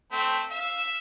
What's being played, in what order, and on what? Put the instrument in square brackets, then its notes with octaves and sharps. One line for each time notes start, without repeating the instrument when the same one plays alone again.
[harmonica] A3 C4 [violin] G6 B6
[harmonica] E5 [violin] F5 E7